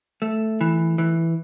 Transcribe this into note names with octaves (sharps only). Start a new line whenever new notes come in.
A3
E3
E3